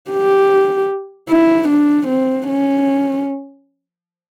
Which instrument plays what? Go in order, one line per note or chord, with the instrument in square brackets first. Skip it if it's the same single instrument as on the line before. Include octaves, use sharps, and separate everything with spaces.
[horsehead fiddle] G4
E4
D4
C4
C#4